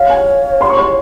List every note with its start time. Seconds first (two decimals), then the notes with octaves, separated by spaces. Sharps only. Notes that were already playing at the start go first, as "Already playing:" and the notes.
Already playing: C#5 F5
0.10 G#5
0.61 C6
0.70 C#6
0.77 C6